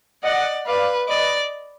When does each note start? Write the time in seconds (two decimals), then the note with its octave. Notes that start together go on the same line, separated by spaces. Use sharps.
0.24 D5 D#5 F#5
0.67 B4 D5 F5
1.08 B4 D5 D#5